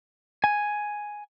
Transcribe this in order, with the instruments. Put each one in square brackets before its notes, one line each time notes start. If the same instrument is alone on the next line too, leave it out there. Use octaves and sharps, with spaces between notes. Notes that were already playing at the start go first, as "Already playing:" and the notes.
[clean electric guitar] G#5